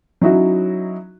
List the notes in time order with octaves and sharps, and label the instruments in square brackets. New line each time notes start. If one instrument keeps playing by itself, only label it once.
[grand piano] F#3 C#4 D#4 E4 F#4